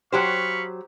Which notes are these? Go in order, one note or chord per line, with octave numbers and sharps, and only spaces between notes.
F#3 G4 C5 F5 B5 C#6